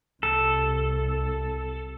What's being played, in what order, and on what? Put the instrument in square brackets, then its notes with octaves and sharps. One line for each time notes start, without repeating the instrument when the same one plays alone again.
[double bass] C2 [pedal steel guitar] A4